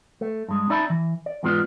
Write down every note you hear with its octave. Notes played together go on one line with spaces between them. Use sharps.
A3
G2 G#3
C#4 D#4 D5 E5 A5 B5
E3
D5
E2 G#2 G#3 B3 F4 D5